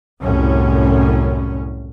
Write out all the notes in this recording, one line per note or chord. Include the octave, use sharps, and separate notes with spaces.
C2 F#2 A2 C#4